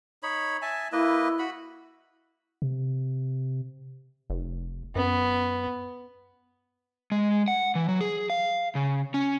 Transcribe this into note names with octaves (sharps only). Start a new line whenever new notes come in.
D#4 C#5 B5
E5 G#5 A5
A#3 E4 B4 D#5
F#4 B5
C3
F1
F#2 B3
G#3
F#5
E3
F#3
G#4
F5
C#3
C#4